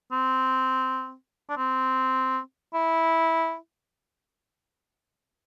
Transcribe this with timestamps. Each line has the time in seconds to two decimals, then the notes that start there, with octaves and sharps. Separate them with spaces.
0.12 C4
1.49 D4
1.57 C4
2.74 E4